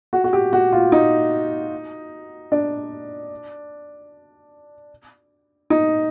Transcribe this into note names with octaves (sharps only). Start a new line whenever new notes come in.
F#4
F#4
G4
F#4
F4
D#4
D4
D#4